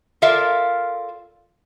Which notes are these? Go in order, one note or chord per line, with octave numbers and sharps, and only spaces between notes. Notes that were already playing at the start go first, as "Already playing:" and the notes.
F4 A4 A#4 D5 E5 F5